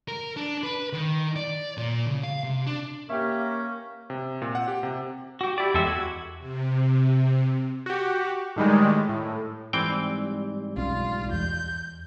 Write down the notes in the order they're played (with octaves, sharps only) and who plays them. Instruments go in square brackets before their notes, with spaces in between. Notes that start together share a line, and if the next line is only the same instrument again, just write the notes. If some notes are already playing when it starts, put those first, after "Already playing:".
[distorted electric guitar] A#4
D4
B4
D#3
D5
A#2
C#3
F5
C3
D4
[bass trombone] A#3 [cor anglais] C#4 [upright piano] G4 E5 [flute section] A#4 C#6 G6
[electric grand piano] C3
A#2
F#5
G4
C3
[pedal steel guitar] F#4 G4
[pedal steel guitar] E4 D5 [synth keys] G4 G5
[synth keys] E2 [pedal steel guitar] G#3 A4 E5
[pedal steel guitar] F#4 [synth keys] G#6
[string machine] C3
[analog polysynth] F#4 G4
A2 D#3 G3 G#3
A2
[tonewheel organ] G#2 G3 [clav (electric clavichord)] E3 C4 G5
[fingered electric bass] B1 C#4 [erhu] F4
[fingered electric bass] E2 [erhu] G6